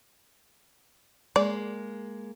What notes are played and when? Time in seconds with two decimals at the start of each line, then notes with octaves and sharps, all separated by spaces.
1.36 G#3 A#3 D5